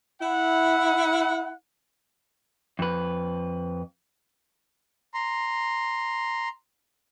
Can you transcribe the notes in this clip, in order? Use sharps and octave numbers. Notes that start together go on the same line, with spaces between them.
E4 F#5
F2 B4
A#5 C6